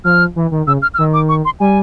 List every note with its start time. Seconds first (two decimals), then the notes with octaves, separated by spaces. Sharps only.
0.04 F3 F6
0.36 E3
0.51 D#3
0.67 C#3 E6
0.82 F6
0.94 F6
0.98 D#3 E6
1.14 D6
1.29 C#6
1.45 C6
1.60 G3 G#5